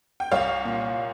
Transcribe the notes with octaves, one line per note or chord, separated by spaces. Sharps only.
G5
C2 C#5 F5
A#2